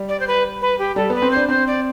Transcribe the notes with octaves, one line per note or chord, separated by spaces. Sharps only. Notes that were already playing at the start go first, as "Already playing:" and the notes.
Already playing: G3
D5
C5
B4
B4
G4
G3 A4
B3 B4
C4
C5
D4
C4 C5
D5